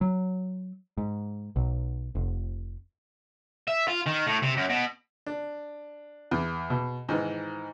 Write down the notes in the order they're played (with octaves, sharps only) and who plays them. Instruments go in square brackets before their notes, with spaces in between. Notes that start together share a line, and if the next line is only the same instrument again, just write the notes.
[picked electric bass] F#3
G#2
B1
F1
[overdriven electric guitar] E5
F4
D#3
A2
C3
F#2
B2
[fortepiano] D4
E2
B2
G#2 D#3 E3